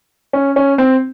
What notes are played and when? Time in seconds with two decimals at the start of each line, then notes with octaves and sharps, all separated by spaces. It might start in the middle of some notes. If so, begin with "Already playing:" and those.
0.33 C#4
0.56 C#4
0.78 C4